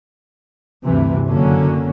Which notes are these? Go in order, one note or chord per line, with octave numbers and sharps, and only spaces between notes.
D2 G2 C3 E3
F#1 D3 F#3 A#3 C#4